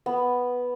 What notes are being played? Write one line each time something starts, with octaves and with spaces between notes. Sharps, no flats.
B3